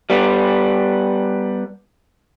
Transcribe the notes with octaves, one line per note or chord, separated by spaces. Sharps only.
G3 B3